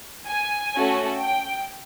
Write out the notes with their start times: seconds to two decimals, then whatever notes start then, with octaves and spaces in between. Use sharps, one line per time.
0.28 G#5
0.75 A3 C#4 F#4 A4
1.21 G5